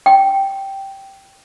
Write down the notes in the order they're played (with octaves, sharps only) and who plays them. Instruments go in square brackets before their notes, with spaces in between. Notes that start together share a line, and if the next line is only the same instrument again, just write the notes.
[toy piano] G5